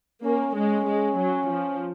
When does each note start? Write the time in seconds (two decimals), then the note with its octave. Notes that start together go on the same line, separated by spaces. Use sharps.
0.24 A#3 C#4
0.55 G#3 C#4
0.87 G#3
1.18 F#3
1.49 F3